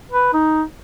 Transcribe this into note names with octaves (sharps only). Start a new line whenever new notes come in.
B4
D#4